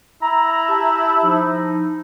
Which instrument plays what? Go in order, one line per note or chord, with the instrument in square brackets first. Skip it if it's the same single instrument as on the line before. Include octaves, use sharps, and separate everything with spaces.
[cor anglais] E4 [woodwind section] A#5
[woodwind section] G4 E5 A5
F3 D#4